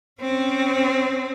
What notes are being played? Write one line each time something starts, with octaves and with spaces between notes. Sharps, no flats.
C4 C#4